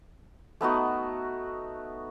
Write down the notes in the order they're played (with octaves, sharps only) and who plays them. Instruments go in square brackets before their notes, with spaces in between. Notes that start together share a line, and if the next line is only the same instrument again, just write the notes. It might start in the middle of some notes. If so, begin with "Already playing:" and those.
[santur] A3 B3 D#4 F#4